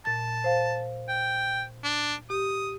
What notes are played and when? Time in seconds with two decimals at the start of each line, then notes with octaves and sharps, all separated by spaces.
0.05 A#2 A5 A6
0.44 C5 F5
1.09 G5
1.84 D4
2.30 G4 D#6